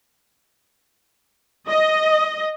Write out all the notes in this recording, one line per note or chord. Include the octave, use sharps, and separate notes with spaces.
D#5